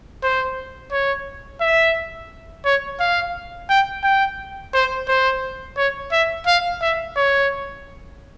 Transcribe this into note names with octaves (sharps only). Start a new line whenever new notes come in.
C5
C#5
E5
C#5
F5
G5
G5
C5
C5
C#5
E5
F5
E5
C#5